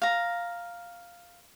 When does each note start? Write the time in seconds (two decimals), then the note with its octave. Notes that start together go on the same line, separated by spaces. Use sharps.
0.02 F5 A#5